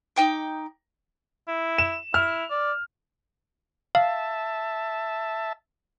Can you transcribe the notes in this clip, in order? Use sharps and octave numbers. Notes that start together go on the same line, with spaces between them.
D#4 G5 D6
E4
E7
E4 F6
D5
E5 F5 A5